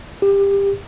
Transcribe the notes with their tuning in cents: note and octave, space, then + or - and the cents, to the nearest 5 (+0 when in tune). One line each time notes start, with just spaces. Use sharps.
G4 +20